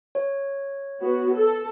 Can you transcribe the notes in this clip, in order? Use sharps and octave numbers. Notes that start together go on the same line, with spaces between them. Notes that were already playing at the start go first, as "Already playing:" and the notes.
C#5
B3 F#4
A4